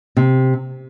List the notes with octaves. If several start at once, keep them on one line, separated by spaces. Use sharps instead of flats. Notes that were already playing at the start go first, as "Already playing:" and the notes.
C3